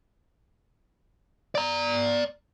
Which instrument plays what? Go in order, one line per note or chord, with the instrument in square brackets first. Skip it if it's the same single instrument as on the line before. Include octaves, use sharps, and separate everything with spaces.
[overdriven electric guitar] D5 A#5